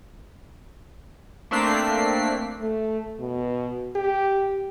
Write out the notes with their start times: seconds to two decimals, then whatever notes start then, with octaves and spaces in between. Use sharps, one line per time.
1.51 A3 A#3 C4 D4 B6 C7
2.61 A3
3.20 B2
3.95 G4